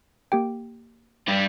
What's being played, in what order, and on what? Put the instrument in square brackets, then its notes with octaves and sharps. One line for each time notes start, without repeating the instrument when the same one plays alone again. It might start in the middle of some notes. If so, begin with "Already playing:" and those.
[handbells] A#3 G4 G5
[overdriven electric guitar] G2 G3